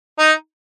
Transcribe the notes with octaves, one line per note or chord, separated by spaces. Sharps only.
D#4